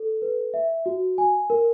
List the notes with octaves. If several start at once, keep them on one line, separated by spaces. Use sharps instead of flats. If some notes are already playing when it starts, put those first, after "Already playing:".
Already playing: A4
B4
E5
F#4
G#5
A#4